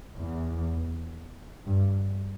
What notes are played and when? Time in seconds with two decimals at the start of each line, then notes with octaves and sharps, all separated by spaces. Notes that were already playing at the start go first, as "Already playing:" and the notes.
0.17 E2
1.66 G2